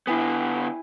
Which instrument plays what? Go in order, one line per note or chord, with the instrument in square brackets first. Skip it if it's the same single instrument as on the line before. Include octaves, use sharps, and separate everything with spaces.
[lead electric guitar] D3 B3 [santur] E4 G5 G#5